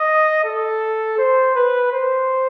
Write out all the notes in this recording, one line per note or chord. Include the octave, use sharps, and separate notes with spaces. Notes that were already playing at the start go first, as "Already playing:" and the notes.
Already playing: D#5
A4
C5
B4
C5